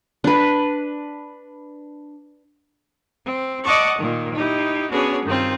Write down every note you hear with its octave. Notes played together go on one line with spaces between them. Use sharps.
D4 B4
C4
D5 D#5 F#5 A5 C#6 D6
A#2 D#3
D#4 E4 G4
B3 C#4 D4 F#4 G#4 C#5
G2 D#3 C4 F4